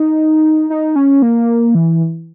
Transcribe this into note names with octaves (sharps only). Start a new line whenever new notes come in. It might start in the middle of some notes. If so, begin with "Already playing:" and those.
Already playing: D#4
D#4
C#4
A#3
E3